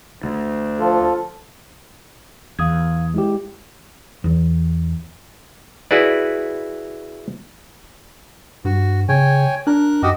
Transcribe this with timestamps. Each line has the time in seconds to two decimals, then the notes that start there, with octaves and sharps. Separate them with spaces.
0.24 D2
0.79 F3 F4 A4
2.59 E2 F5 D#6 G#6
3.14 G#3 E4 G4
4.24 E2
5.91 E4 F#4 G#4 B4 D5
8.65 G2 F#4
9.09 C#3 C#5 G5 G#5
9.67 D4 A#4 F#6
10.03 F#2 F#4 G4 D#5